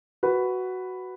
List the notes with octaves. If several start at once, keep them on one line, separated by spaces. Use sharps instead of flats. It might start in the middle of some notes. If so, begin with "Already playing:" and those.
F#4 B4